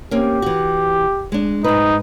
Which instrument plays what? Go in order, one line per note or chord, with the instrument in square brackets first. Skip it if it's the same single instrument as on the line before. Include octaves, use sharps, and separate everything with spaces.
[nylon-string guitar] A#3 C4 C#4 [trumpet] G4
[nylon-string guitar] E3 F#4
G#3 D4
[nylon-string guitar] G#2 B4 [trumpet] D#4